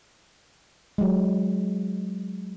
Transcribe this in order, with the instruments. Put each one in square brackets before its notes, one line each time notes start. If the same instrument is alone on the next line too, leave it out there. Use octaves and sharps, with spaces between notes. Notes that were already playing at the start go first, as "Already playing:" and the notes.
[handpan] F#3 G#3